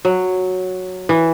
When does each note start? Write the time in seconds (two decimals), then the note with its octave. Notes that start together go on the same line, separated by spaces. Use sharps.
0.05 F#3
1.09 E3